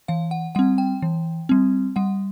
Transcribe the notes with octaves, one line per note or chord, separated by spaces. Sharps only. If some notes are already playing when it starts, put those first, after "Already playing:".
E3 F5
F#5
G3 C4 F#5
G5
E3
G3 C4
G3 F#5